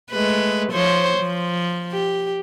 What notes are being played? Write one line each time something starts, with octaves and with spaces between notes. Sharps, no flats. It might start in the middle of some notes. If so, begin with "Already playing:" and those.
G#3 A3 B4
F3 C5 C#5
F3
G4